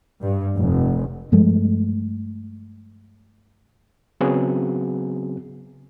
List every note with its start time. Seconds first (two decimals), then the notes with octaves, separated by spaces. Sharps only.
0.22 G2
0.56 F1
1.32 G2 F3 G#3 A3
4.21 C#3 F#3 B3 C4 F#4 G#4